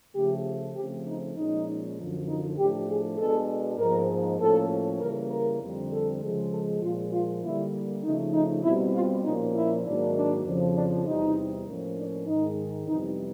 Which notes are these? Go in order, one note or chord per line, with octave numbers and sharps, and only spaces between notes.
C#3 F3 A3 G4
C#3 F3 A3 C4 G4
D#4
A#2 F3 G#3 C#4 D#4
F#2 D3 F3
D#4
A2 F3 A3 D4 G4
G#4
B2 G#3 B3 D4 A4
G#2 F3 A#3 A#4
A2 F3 A#3 C#4 A4
C#3 E3 G3 A#3 A#4
A#4
F2 D3 G3 C4
A4
C#3 F3 G#3
A4
A#2 F3 G#3 F4
F4
D3 G3 A#3 E4
C#3 F3 A3 D#4
D#4
B2 G3 C4 E4
F4
A#2 F3 A#3 C#4 D#4
E4
G#2 D#3 F#3 A#3 D4
D4
F2 C#3 F3
D4
E2 C3 E3 G3 C4 D#4
A2 F3 A#3 C#4
D4
G#2 D#3 G#3 D#4
F2 C3 E3 G3 B3 D#4